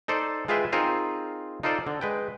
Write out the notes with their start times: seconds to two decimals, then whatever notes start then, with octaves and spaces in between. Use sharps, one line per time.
0.08 D#4 A4 C5 D5
0.48 G#3 F4 G#4 B4 E5 G5
0.72 C4 D#4 F4 G#4 A#4 C5
1.63 D#4 F4 A4 C5 D5
1.87 D3
2.01 G#3 B4 G5